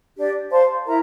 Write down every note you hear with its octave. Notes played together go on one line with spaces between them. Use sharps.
D4 G4 D5
C5 F5 A5 C6
E4 A#4 E5 A#5